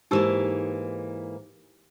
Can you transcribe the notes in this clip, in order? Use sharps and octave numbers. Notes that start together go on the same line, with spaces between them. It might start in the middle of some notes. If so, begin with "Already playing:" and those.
G#2 E3 A#3 D#4 G4 E6